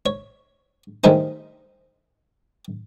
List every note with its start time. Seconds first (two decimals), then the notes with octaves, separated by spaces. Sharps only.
0.06 C#5
1.04 D#3 G3 A3 D#4 G#4 C5